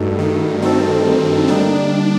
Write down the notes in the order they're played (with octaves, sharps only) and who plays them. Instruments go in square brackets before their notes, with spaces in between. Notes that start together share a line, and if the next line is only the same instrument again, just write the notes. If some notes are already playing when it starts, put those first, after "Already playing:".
Already playing: [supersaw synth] G2 [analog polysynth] A3 D#4 F#4 A4
[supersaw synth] D#3
[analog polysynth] A3 D#4 F#4 A4 [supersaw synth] C4
[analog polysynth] D3 G3 A#3 D#4 [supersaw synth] D4